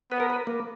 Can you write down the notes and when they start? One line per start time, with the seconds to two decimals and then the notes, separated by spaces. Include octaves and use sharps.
0.11 B3 B4
0.20 A#4
0.30 B4
0.47 A#3